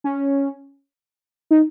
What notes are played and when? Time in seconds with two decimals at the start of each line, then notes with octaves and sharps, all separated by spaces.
0.04 C#4
1.51 D#4